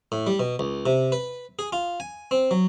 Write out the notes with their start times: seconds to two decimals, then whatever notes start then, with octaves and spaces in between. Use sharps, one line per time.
0.12 A2
0.27 G3
0.40 B2
0.59 C#2
0.86 C3
1.12 B4
1.59 G#4
1.73 F4
2.00 G#5
2.31 C4
2.51 F#3